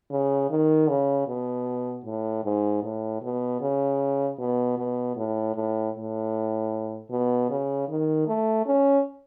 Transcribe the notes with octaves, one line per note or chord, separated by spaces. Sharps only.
C#3
D#3
C#3
B2
A2
G#2
A2
B2
C#3
B2
B2
A2
A2
A2
B2
C#3
D#3
A3
C#4